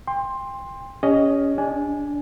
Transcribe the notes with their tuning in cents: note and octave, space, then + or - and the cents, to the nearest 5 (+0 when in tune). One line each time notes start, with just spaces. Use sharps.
G5 +30 C6 +10
C#4 +20 G4 +45 D#5 +0
D4 -20 G#5 +0